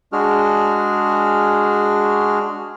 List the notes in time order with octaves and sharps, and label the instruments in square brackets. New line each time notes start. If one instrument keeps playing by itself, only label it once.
[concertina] G#3 D4 F#4 G#4 F6